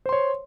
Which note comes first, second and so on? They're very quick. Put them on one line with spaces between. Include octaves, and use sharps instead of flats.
C5 C6 C#5